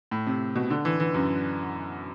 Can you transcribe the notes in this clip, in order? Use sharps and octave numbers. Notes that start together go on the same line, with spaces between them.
A2
C3
B2
D3
E3
E3
F#2